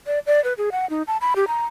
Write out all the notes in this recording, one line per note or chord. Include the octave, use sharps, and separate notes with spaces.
D5
D5
B4
G#4
F#5
D#4
A5
B5
G4
A#5